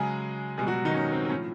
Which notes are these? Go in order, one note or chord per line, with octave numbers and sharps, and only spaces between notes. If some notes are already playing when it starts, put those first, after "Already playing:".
Already playing: C#3 F#3 G#3 G#4
B2 G3 G#3 G#4
F#3 F#4
D#3 D#4
C#4
C4
C4
A2 F3 C#4